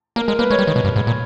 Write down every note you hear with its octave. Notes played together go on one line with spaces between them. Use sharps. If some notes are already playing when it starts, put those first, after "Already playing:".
A#3 A#4
G#3 A#4
A#3 B4
G#3 C#5
G3
D#3
B2
G2
G#2
A#2